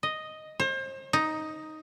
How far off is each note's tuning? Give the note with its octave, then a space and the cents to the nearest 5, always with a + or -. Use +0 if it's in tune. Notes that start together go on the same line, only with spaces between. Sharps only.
D#5 +0
C5 +35
D#4 +5